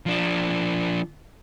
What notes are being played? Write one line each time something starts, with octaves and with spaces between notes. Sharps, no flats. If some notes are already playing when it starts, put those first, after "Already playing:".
F3 D4